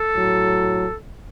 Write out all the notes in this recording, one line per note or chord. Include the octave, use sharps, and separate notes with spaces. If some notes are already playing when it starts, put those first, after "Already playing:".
Already playing: A4
A2 F#3